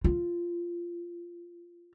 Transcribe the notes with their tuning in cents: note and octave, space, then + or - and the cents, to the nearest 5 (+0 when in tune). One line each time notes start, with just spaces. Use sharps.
F4 -15